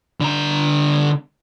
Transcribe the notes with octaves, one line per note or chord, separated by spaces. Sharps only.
D3 A#5